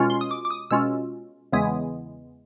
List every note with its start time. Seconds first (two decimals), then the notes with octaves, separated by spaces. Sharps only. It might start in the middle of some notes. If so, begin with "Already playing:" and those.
Already playing: B2 G#3 C#4 F4
0.10 C6
0.21 D#6
0.31 D6
0.45 D6
0.50 D#6
0.71 B2 G#3 C#4 F4 E6
1.52 E2 C#3 E3 G#3 B3 D#6